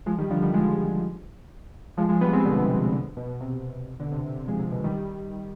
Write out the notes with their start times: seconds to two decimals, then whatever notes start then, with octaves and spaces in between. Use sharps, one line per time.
0.06 F3 G#3
0.18 D#3 G3
0.30 D3 F3
0.42 D#3 G3
0.54 F3 G#3
1.97 F3 G#3
2.09 F3 G#3
2.21 G3 B3
2.33 G#3 C4
2.45 B2 D3
2.56 C3
2.68 B2
2.81 C3
2.93 B2 D3
3.17 B2
3.40 C3
4.00 B2 D3
4.12 C3
4.24 C3
4.35 C3
4.48 F3 G#3
4.59 C3
4.71 B2
4.84 D#3 G3